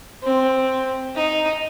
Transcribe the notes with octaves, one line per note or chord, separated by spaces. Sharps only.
C4
D#4